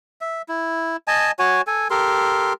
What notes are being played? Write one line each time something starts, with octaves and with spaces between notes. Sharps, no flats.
E5
E4
D#5 G#5 A5
F#4 C#5 G#5
A4 G#5
G4 A4 A#4 C6